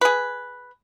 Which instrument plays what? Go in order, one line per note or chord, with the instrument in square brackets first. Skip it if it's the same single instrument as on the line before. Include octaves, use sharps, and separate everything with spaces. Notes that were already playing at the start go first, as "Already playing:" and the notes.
[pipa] G#4 B4